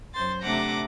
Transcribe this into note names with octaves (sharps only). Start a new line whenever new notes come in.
F#2 C5 C6 A6
C3 A3 D4 F#5 A#5 D6